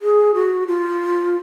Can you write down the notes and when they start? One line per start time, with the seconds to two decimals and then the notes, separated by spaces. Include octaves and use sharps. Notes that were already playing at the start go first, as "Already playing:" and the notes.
0.02 G#4
0.34 F#4
0.67 F4